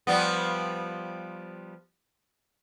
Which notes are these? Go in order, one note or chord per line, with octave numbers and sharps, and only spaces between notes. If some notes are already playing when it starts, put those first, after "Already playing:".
F3 G3 B3